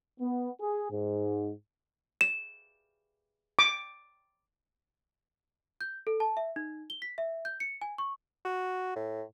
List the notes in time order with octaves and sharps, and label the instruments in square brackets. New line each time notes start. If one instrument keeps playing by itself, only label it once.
[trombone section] B3
G#4
G#2
[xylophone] E7
[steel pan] D6
[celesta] G6
A4
A5
E5
D#4
G7
B6
E5
G6
C#7
G#5
C#6
[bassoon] F#4
A2